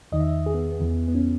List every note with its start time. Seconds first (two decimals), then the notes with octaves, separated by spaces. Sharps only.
0.12 E2 D#3 D#5
0.20 E5
0.29 D#5
0.46 G#4
0.54 B3
0.72 B3
0.80 E2 C#3 E3
1.08 B3
1.15 C#4